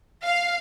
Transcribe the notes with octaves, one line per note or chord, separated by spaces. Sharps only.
F5